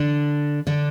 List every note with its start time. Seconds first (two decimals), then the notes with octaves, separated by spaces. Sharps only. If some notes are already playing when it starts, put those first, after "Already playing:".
Already playing: D3 D4
0.67 D3 D4